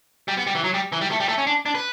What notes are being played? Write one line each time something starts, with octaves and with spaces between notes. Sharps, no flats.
G3
B3
G3
E3
F#3
G3
E3
G3
A3
G3
A3
C#4
D4
D4
B4